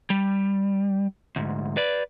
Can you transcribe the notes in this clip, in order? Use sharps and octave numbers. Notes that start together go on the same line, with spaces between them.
G3
D2 G#2
B4 D5